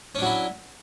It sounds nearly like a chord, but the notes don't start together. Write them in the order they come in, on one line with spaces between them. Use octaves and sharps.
C#4 D4 F#3 E4